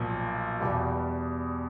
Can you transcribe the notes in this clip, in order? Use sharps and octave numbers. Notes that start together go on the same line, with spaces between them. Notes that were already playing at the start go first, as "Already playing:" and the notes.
Already playing: B1 A#2 F3
E2 B2 G3